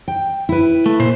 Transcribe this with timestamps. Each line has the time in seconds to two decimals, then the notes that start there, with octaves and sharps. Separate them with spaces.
0.08 G5
0.49 E4 B4
0.86 A3
0.99 A#2 C5